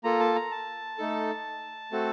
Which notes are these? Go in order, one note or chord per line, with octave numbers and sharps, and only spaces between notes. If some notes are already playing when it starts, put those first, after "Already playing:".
A#3 F4 A4 A#5
A5
A#5
A5
A3 D#4 A4
A3 C4 F#4 A4